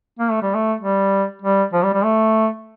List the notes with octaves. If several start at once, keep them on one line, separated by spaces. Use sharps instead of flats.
A#3
A3
G3
A3
G3
G3
F3
G3
G3
A3